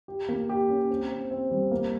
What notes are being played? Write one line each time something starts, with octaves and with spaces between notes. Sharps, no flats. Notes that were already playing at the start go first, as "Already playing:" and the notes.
G4
A#3
G4
C#4
C4
C4
C4
G3
A#3